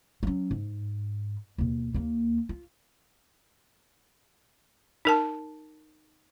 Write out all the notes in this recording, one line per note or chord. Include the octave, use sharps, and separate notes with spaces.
F#3 C#4
G#2
D#2 B2
D#2 A#3
F4
D#4 A#4 A5